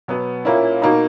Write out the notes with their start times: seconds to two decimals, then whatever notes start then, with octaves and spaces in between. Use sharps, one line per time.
0.08 B2 F#3 B3
0.45 A#2 A#3 C#4 E4
0.82 B2 A#3 D#4